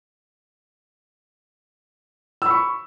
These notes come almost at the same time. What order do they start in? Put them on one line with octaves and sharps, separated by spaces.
E6 B5 C#6